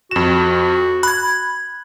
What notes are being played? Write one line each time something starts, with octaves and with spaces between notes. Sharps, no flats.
F2 F#4 E7
B5 F#6 G#6